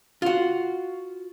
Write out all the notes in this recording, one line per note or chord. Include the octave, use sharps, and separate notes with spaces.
F4 F#4